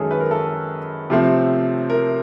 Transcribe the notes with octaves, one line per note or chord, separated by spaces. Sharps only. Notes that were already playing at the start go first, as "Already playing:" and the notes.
Already playing: F#2 D#3 G#3 C#4 G#4 A4
B4
A#4
A4
C3 F3 A3 C4
A#4